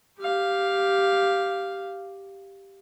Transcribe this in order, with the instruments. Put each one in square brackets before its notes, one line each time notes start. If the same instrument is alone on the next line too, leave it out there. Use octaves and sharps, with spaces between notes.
[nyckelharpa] G4 F5